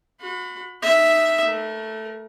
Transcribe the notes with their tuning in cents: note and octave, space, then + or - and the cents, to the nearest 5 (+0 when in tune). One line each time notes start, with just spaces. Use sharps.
F#4 -30 B5 +20
D#4 -10 E5 +0
A3 +0 A#4 +30